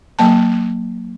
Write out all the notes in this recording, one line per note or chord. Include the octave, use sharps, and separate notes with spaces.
F#3 A#3 A5